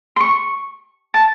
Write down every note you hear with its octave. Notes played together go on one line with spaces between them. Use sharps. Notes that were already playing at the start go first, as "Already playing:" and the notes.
C6
C#6
A5